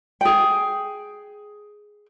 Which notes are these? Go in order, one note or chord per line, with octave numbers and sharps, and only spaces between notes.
G#4 G5